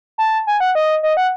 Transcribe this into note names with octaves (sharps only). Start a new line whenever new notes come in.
A5
G#5
F#5
D#5
D#5
F#5